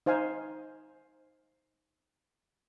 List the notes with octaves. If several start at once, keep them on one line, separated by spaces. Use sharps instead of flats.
D#4 C5 F5 G#5